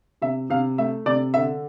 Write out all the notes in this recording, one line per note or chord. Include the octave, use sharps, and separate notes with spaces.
C3 E5
C3 F5
A3 E5
C3 D5
D3 E5